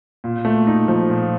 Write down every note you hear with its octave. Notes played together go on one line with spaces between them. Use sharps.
A#2
A3
D#4
F3
A#2